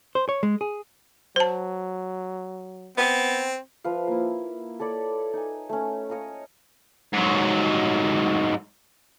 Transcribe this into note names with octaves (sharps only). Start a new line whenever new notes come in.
C5
C#5
G#3
G#4
F#3 C5 A5
B3 C4
F3 B4 E5 F5
A#3 E4
A4 C#5 D5 B5
D#4 G#5
A3 C#4
C#5 D#5 F5 A#5
G#2 F#3